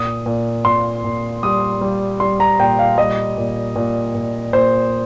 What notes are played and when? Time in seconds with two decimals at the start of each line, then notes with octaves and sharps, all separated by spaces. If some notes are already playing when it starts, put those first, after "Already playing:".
Already playing: A#2 D#6
0.26 A#2
0.65 A#2 C6
1.04 A#2
1.43 G3 D#6
1.81 G3
2.20 G3 C6
2.40 A#5
2.59 A#2 G5
2.79 F5
2.98 G3 D#5
3.37 A#2
3.76 A#2
4.15 A#2
4.53 A#2 C5